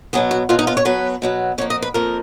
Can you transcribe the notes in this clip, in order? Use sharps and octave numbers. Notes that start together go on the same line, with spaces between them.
B2 F#3 B3 G#4
F#4
B2 F#3 B3 F4
D#4
F4
C#5
B2 F#3 B3 B4
B2 F#3 B3
F2 F3 A#3 C#5
D#5
B4
F2 F3 A#3 A#4